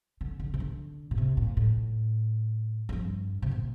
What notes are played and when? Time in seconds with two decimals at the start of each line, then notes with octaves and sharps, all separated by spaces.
0.21 D3
0.40 D3
0.54 C3
0.60 D3
1.11 A#2
1.18 C3
1.37 A#2
1.57 A2
2.89 F2
2.92 G2
3.42 C3
3.51 A#2